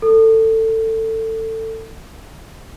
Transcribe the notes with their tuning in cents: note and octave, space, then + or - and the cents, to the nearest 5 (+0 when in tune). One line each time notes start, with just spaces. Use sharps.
A4 +20